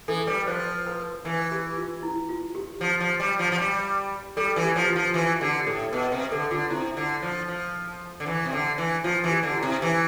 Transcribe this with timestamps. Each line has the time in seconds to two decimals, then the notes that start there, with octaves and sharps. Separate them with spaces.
0.08 E3 A4
0.27 G3 B4
0.47 F3 C5
0.87 B4
1.25 E3 B4
1.51 G4
1.77 F4
2.03 E4
2.29 F4
2.55 G4
2.81 F3
3.00 F3
3.20 G3
3.39 F3
3.52 F3
3.58 G3
4.37 G3 A4
4.56 E3
4.62 G4
4.76 F3
4.88 F4
4.95 F3
5.14 E3 F4
5.40 D3 G4
5.66 A2 A4
5.92 B2 B4
6.12 C3 B4
6.31 D3 A4
6.51 D3 F4
6.70 C3 E4
6.97 D3
7.22 F3
7.48 F3
8.20 D3
8.26 E3
8.45 C3
8.53 D3
8.78 E3
9.04 F3 F4
9.24 E3
9.30 G4
9.43 D3
9.56 E4
9.62 C3
9.82 E3